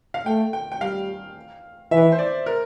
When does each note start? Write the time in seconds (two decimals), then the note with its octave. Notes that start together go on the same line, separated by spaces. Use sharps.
0.14 F5
0.26 A3 G5
0.53 G5
0.72 G5
0.81 G3 F5
1.91 E3 E5
2.12 C5
2.19 D5
2.46 A#4